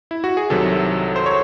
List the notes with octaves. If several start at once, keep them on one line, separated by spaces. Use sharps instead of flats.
E4
F#4
G#4
C2 C3 D#3 F#3 A4
C5
C#5